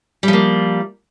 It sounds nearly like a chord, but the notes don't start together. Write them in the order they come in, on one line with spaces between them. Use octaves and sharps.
G3 F3 A#3